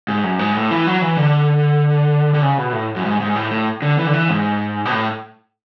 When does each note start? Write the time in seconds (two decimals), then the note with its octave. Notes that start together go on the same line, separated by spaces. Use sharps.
0.08 G#2
0.24 F#2
0.39 G#2
0.55 A2
0.71 E3
0.87 F#3
1.02 E3
1.17 D3
2.34 D3
2.42 C#3
2.58 B2
2.73 A2
2.96 F#2
3.05 G#2
3.20 G#2
3.35 A2
3.51 A2
3.82 D3
3.98 E3
4.07 D3
4.13 E3
4.29 G#2
4.85 B2
4.91 A2